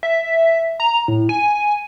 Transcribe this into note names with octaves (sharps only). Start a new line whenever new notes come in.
E5
A#5
A2
G#5